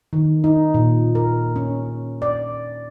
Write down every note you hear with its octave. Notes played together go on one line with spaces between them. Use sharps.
D#3
D#4
A#2
A#4
C#4
D5